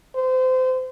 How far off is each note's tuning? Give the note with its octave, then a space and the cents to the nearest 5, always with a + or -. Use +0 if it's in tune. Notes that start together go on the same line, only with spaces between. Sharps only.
C5 -25